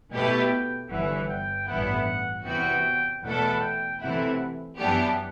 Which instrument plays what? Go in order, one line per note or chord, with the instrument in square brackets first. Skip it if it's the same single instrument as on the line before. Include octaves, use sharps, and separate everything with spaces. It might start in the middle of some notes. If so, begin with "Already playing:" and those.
[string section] B2 A3 E4 G4 B4 [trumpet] G5
[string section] G1 G2 E3 [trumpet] F#5
[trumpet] G5
[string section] A1 G2 E3 B3 E4 [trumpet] F#5
[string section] E2 C3 E3 B3 F#4 [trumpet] G5
[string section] E2 B2 A3 E4 A4 [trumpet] F#5
[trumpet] G5
[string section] C3 E3 A3 E4 [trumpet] F#5
[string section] F#2 E3 B3 D4 G4 [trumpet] F#5